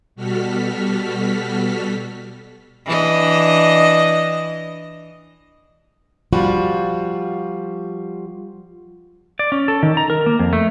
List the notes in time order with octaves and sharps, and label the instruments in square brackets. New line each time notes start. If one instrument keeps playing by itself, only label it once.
[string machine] B2 G3 F#4 A4 F6 B6
[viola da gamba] E3 D4 D#5
[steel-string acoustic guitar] F3 G3 F4 F#4
[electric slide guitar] D5
C#4
A4
D#3
A#5
A#4
A#3
F2
A3